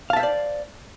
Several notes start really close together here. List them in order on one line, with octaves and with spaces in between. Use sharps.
F5 A5 E5 C5 D5